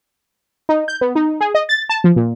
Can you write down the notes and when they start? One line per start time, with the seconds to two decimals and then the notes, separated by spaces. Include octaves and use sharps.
0.69 D#4
0.88 G6
1.01 B3
1.15 D#4
1.40 G#4
1.55 D#5
1.69 A6
1.89 A5
2.04 F3
2.16 A#2